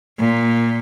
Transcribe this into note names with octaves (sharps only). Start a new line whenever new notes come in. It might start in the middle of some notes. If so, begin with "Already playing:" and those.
A#2